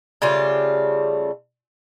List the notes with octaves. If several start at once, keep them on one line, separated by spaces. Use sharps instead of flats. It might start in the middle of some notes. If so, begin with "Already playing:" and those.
C#3 G3 A3 F4